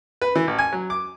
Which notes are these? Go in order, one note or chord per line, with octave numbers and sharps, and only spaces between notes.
B4
E3
A1
G#5
F#3
D6